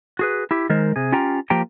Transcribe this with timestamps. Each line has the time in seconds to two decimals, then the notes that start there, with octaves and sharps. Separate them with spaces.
0.19 F#4 G#4 B4
0.51 E4 G4
0.70 D#3 G#3 A#4 C5
0.96 C3 G#4
1.12 C#4 F4 G4 G5 A#5
1.50 F3 A#3 F4 G4 G5 A#5